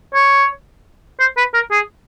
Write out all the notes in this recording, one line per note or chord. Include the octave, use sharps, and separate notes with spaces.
C#5
C5
B4
A#4
G#4